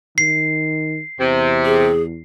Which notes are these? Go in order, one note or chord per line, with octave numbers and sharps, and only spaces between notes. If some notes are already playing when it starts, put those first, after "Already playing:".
D#3 C7
E2 C3
G#4